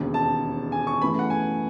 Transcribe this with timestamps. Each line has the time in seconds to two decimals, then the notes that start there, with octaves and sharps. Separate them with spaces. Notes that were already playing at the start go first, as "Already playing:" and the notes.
Already playing: E1 D#2 C#3
0.14 A5
0.72 G#5
0.87 C#6
1.01 F#2 C#3 E3 A3 B5
1.19 F#5
1.30 G#5